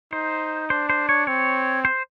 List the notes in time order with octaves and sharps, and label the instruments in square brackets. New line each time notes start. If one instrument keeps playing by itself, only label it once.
[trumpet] D#4 [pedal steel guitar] C5
[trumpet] D4 [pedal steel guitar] C5
[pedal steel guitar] C5
C#5
[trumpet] C4 [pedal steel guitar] C#5
[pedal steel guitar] C5